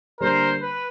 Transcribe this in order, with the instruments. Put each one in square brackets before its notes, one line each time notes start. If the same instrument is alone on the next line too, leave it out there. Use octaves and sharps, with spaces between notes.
[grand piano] D3 G3 A#3 [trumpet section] A#4 C5
[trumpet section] B4